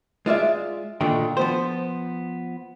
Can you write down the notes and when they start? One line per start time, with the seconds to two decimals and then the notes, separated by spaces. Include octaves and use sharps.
0.26 G#3 F4 D5 E5
1.01 A#2 D3 D#3 G5
1.37 F3 B3 C5